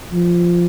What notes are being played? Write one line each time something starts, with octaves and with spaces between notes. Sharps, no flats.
F3